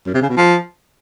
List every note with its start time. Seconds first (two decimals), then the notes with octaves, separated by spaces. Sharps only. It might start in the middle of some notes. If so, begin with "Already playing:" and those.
0.06 F#2
0.14 C3
0.22 C#3
0.29 B2
0.37 F3